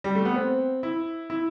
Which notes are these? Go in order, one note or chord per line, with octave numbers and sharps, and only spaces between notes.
G3
A3
B3
C4
E4
E4